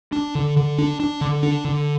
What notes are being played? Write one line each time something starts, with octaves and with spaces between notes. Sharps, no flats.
D4
D3
D3
D4
D4
D3
D4
D3